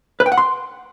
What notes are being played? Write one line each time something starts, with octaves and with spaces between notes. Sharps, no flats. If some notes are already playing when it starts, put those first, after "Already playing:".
B4
G5
F#5
C6